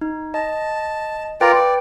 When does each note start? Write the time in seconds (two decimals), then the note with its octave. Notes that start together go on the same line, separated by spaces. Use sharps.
0.01 D#4
0.34 D#5 A5
1.41 F4 A#4 B4 D5 G5
1.55 D5